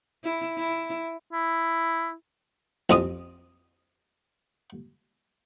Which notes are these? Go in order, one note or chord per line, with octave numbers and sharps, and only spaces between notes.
E4
E4
E4
A1 F2 D#6